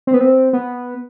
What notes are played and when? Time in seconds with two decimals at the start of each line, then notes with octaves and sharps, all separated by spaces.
0.07 C4
0.14 B3
0.21 C4
0.53 B3